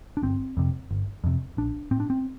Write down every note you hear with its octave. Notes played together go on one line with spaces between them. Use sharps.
D4
G1 C4
F2 C3
G1
F2 C3
A#1 D4
A2 C4
D4
C4